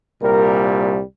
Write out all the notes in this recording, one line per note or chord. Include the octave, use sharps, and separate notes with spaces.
C2 A#2 G3 A#4